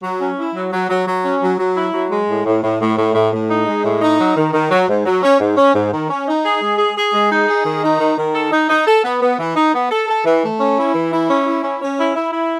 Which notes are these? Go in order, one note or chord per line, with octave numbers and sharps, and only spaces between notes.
F#3
C#4
E4
F#3
F#3
F#3
F#3
C#4
F#3
F#3
E4
F#3
G#3
A2
A2
A2
A2
A2
A2
A2
D#4
G#3
A2
D#4
F#3
D#3
D#3
F#3
G#2
F#3
C#4
G#2
C#4
G#2
D#3
C#4
D#4
G#4
G#3
G#4
G#4
G#3
D#4
G#4
D#3
D#4
D#3
D#3
A4
D#4
D#4
A4
B3
B3
E3
D#4
B3
A4
A4
E3
A3
C#4
E4
E3
E4
C#4
E4
C#4
C#4
E4
E4
E4